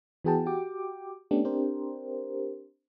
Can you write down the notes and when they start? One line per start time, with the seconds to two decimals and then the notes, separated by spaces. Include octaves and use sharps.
0.24 E3 B3 F#4 G#4 G5 A5
0.46 F#4 G4 G5 D6
1.31 A3 B3 C#4 D4 G4
1.44 C4 D4 G4 A#4 C5